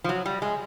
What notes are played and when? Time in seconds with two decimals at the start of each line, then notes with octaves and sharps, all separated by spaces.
0.04 F3
0.09 F#3
0.26 G3
0.42 G#3